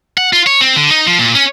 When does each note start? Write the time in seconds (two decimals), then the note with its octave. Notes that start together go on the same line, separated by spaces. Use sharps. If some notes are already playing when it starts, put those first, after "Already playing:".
0.18 F#5
0.33 F4
0.47 C#5
0.61 C4
0.76 D3
0.91 D#4
1.07 F3
1.19 A#2
1.35 C#4